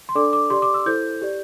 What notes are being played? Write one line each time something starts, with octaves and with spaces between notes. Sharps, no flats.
C6
D4 A4 D5 D6
D6
G4 D5 C6
D6
E6
E4 A4 C5 G6
G4 D5